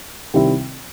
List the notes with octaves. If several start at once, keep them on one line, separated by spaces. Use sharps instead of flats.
C3 D#3 G3 C4 E4